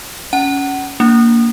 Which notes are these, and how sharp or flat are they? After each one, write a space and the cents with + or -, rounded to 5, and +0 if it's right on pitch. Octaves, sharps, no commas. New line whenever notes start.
C#4 +10 F#5 +25
A#3 +0 D4 -15